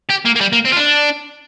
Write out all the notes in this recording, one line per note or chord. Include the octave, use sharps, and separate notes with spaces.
G4
A#3
A#3
G3
A#3
C4
F4
D4